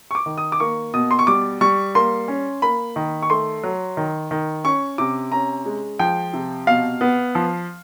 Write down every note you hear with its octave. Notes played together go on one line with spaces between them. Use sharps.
C#6
D6
D#3
D#6
D6
A#3 C#6
B2 D#6
C6
C#6
G3 D6
G3 C#6
A#3 C6
C#4
A#3 B5
D#3
C#6
A3 C6
F#3
D#3
D#3
C#4 C#6
C3 D6
C#4 A#5
G#3
F3 G5
C3
B2 F5
B3
F3